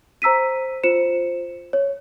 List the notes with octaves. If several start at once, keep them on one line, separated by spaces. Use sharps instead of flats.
C5 A#5 E6 B6 D#7
F4 C5 C#7 E7
C#5